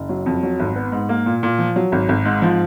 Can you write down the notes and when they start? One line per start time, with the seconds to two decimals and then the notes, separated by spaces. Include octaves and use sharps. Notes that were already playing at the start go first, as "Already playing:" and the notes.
Already playing: F#1
0.09 F#3
0.26 F2
0.43 F#3
0.59 G#1
0.76 B3
0.92 G#2
1.09 A#3
1.26 A#2
1.43 A#2
1.59 F3
1.76 F#3
1.92 G#1
2.09 G#1
2.25 G#2
2.42 F3